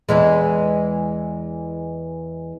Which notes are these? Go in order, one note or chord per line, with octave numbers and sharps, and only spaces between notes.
E2 E3 G#3